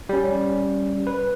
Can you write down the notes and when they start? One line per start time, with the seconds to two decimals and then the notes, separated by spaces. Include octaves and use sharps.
0.09 G3 C#4
1.07 B4